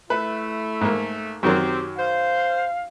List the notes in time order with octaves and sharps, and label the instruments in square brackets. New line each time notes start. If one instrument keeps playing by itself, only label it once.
[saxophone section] A3 [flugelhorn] E4 [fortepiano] B4
[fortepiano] G#2 A#3
[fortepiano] F#2 D#3 F#3 [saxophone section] C4 [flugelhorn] G4
[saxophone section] C5 [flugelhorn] F5